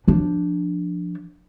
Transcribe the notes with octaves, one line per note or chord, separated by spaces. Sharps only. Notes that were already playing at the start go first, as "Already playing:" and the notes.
F3 D4